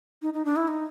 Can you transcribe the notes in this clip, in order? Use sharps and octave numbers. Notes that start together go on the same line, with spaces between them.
D#4
D#4
D4
E4
D#4